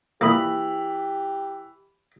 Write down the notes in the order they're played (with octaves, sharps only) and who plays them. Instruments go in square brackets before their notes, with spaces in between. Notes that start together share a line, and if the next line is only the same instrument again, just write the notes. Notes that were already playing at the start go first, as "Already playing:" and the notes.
[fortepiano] E3 B5 [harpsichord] A#3 D#6 [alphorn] G4